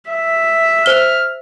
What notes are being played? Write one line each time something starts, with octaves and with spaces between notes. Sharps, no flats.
E5
C5 F6 G7